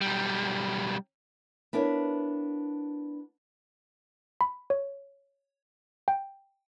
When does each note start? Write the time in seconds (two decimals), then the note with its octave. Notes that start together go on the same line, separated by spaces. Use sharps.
0.01 B1 G3
1.73 B3 D4 E4 A#4 C#5
4.41 B5
4.70 C#5
6.08 G5